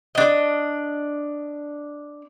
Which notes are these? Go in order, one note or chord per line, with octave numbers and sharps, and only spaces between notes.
D4 D#5